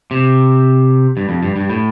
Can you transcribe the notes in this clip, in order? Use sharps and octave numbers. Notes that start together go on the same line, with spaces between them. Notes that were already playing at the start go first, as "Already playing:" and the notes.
C3
G2
F2
G2
G2
A2